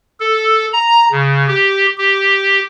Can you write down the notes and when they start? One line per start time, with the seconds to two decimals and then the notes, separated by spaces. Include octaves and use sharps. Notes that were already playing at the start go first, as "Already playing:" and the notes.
0.20 A4
0.72 A#5
1.12 C#3
1.48 G4
1.98 G4